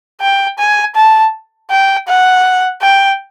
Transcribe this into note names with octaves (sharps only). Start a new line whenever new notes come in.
G5
G#5
A5
G5
F#5
G5